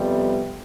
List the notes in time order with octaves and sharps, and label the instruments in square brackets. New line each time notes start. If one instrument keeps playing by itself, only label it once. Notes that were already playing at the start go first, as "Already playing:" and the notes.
Already playing: [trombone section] F2 C3 G3 B3